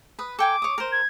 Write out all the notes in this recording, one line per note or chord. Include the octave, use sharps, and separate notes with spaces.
B4 D#6
A4 G5 G#5 D6
C#5 D#6
A#4 C5
G#6